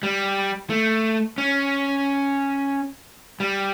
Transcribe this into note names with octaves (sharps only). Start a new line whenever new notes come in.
G3
A3
C#4
G3